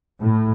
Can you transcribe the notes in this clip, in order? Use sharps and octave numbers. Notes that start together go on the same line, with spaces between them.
A2